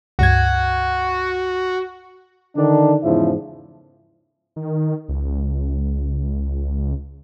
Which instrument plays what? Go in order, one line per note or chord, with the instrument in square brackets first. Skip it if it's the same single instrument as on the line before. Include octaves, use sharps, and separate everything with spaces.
[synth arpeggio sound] C#2 G2 G#6 [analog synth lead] F#4
[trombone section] D3 D#3 D4
E2 G#2 C#3 F3 E4
[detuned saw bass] D#3
C#2